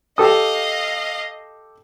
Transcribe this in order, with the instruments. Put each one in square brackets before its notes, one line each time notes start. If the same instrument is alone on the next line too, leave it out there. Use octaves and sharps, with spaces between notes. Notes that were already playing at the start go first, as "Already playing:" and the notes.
[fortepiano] G4 A4 D#6 [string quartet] D#5 F5